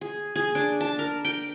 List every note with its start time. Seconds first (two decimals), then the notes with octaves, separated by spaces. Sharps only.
0.01 G#4
0.36 G#4
0.55 D4
0.81 A5
0.99 A#4
1.25 G5